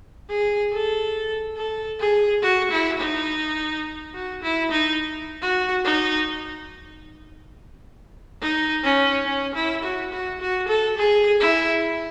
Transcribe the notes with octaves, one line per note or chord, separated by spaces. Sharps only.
G#4
A4
A4
G#4
F#4
E4
D#4
F#4
E4
D#4
F#4
D#4
D#4
C#4
C#4
E4
F#4
F#4
F#4
A4
G#4
E4